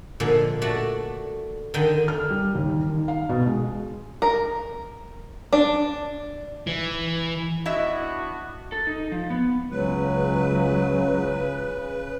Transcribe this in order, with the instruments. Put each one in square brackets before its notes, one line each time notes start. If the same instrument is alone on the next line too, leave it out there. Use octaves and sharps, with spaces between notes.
[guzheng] A#2 D3 F3 G#3
A3 D4 F#4 D5
D3 D#3 D#5 G5
[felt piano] F6
G3
D#2
D#3
F5
B2
G#3
[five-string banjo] A#4
D4
[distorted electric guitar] E3
[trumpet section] B3 D4 F#4 [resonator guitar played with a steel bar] E4 D#5 E5
[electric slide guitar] A4
D#4
F3
B3
[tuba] C#2 [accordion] C#3 B4 [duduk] F#3